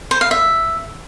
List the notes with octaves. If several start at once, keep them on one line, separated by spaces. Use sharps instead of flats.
C5
F5
E5